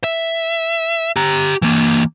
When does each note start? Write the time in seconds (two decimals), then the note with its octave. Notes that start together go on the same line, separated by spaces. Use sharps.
0.04 E5
1.16 G4 A#5
1.62 E3 A#3